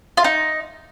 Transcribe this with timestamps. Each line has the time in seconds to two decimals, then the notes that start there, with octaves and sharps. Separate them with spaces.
0.17 F4
0.24 D#4